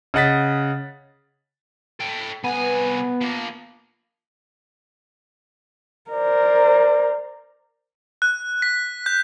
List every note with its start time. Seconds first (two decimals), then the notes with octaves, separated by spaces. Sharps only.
0.14 C#3 D#5 F#5 A6 B6
2.00 A4 G5
2.44 C2 B3 G#5
3.21 F3 A#3
6.11 A#4 C5 D5
8.22 F#6
8.62 B6
9.06 G6